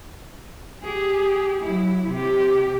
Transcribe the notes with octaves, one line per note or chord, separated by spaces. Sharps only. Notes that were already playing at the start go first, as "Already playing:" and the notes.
G4 G#4
F#3 E4
C3 G4